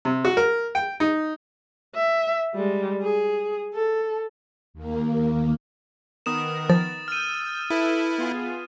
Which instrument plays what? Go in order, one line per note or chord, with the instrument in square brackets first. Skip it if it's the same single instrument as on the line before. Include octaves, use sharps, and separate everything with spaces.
[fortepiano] C3
F#4
A#4
G5
D#4
[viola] E5
G3 G#3
G#4
A4
[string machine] D#2 A#3
[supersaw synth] D#3 B3 A#4 [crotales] D#6 E7
[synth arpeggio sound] F3 [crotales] A6
[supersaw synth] E6 G6 [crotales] F6 D#7
[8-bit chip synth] E4 [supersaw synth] A4 B4 E5
[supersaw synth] B3 F4 G#4